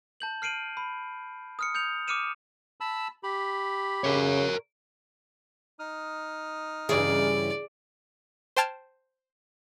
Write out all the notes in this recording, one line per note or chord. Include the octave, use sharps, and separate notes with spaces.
A5 G6 F#7
F6 C7 D7 D#7 F#7
B5
D#6 F6 C#7
D#6 G6 C#7 F7
D6 D#6 F6 C#7 D#7 E7
A5 B5 E6
G4 B5
C#3 A#4 C#5
D#4 D#6 F6
G2 C#3 E3 G#4 D5
C5 G5 A5 F6 G#6